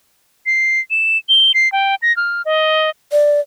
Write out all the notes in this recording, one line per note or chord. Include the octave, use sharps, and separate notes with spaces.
C7
E7
G7
C7
G5
A#6
F6
D#5
D5